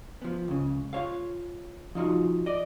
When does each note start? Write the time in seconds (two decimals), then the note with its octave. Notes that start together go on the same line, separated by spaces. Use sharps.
0.22 F3 B3
0.48 C#2 C#3
0.93 F4 C#5 F5
1.95 F3 D#4 F4 F#4
2.46 D5 D#5